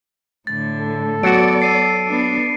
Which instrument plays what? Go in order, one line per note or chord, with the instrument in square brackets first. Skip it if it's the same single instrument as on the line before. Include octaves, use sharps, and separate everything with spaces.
[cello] A2 D3 [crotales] A6
[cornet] A4
[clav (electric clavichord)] F#3 F#4 [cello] B3 D5 [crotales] A6 C#7 D7
[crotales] C7 D#7
[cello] B3 D4